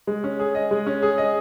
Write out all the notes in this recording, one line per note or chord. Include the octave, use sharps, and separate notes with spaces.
G#3
C#4
G#4
D#5
G#3
C#4
G#4
D#5